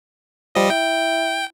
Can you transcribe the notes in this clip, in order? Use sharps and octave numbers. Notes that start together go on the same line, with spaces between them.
F3 G3 D#5
E4 G5